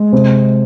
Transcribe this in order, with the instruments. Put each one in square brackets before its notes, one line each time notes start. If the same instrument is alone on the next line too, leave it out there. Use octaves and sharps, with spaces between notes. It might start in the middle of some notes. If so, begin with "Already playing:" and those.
Already playing: [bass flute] G#3
[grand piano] C3